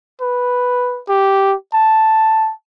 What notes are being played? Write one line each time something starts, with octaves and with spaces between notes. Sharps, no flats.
B4
G4
A5